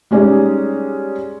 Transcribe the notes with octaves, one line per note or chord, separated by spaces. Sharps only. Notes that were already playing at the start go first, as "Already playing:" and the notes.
G3 G#3 C#4 D#4 D5